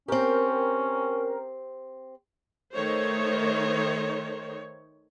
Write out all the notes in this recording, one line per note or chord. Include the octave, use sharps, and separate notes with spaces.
C4 C#4 G4 A#4
D#3 A3 D#4 C5 C#5